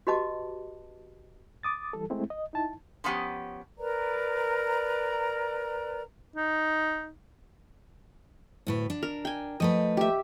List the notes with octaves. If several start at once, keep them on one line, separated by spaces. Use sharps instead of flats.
F#4 G4 B4 D#5 A5 D6
D6 D#6 A6
E3 G3 A4
G#3 A3 C4 E4
D#5
D#4 E4 A5
D3 F3 B3 C#4 G4
A#4 B4 D5 A#5
D#4
D2 A2 B4
D4
A#4
G5 G#5
F3 A3 B4 D#5
G4 E5